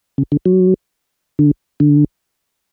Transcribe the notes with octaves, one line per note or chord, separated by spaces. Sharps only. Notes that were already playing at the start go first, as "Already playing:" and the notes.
C#3
D3
F#3
D3
D3